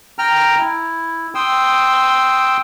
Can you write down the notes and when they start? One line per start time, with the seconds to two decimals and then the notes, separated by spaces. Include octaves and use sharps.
0.19 G5 A#5 F6
0.59 E4
1.35 G5 C6 D#6 E6